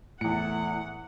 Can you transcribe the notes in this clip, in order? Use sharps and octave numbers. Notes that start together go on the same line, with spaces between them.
E2 A2 E4 F#5 C#7